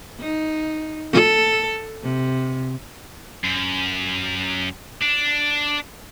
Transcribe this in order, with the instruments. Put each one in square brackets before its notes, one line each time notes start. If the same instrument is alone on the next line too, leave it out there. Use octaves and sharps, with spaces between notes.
[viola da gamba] D#4
A4
C3
[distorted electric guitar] F#2
D4